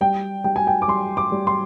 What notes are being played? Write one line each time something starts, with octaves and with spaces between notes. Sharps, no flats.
G3 G5
G3 G5
G#5
G5
D6
G3 C6
D6
G3
C6